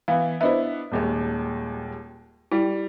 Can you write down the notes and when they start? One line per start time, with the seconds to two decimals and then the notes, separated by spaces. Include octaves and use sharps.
0.08 E3 B3 F5
0.41 B3 D4 E4 C5 D#5 E5
0.91 D#1 D#2 G#3
2.52 G3 E4